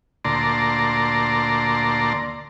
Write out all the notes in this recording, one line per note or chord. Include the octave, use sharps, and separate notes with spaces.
D2 A#2 D5 A5 A#5 C6